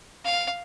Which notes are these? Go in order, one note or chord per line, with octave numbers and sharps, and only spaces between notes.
F5